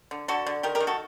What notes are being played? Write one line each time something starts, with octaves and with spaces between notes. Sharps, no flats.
D3
D3 F#4 A4
D3
D#3 G4 A#4
G4 A#4
D#3
F#4 A4